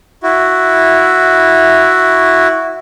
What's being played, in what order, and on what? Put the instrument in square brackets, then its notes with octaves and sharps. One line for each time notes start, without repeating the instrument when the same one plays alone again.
[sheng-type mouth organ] E4 F#4